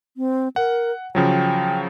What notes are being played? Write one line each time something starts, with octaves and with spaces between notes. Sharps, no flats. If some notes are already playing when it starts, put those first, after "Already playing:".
C4
A#4 F#5
C#3 F3 F#3 G5